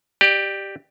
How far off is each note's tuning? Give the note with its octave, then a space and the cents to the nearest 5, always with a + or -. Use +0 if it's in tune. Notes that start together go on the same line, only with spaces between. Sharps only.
G4 +0 D5 +25